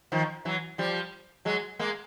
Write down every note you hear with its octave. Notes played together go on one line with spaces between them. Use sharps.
D#3 F3
E3 F#3
F3 G3
F#3 G#3
G#3 A#3